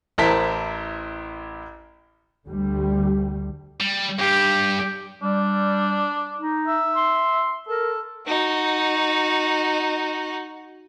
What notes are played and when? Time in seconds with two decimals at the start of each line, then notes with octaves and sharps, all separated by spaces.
0.18 A1 E4 A#4 C5 A5 B6
2.48 D2 D3 G3
3.80 G3
4.19 G2 G4
5.22 G3 D4
6.38 D#4
6.68 E5
6.95 C6
7.68 A4 A#4
8.27 D#4 F#4